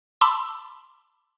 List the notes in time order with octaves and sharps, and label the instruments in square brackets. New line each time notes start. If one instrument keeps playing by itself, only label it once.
[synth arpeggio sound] A5 B5 C6 D6 E6